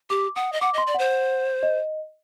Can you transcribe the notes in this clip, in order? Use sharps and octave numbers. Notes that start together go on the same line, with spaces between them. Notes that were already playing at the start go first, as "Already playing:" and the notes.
G4 D6
F#5 D#6
D#5
F#5 D6
D#5
C6
D5
C5 F#5
D#5